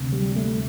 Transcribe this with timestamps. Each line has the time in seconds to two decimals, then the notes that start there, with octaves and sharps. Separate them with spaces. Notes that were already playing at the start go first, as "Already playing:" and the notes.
Already playing: D2 C3
0.12 G3
0.36 A3